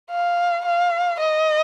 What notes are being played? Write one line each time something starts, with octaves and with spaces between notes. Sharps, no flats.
F5
F5
D#5